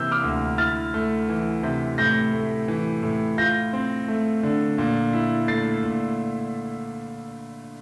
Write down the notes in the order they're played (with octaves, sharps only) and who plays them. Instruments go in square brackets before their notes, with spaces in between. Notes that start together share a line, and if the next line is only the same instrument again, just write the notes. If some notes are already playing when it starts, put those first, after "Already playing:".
Already playing: [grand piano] C3 E3 A#3 E6 G6
D6 F6
D2
E4 F6 A6
A3
E3
C3
A2 G6 A#6
A3
E3
A2
F4 G6 A#6
C4
A3
D3
A#2
E4
A3 A6 C7
A#2